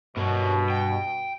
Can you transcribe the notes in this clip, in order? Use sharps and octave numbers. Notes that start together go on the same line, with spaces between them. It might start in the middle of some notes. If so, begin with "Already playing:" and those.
G2 B2 B3 A#4 C#5
G5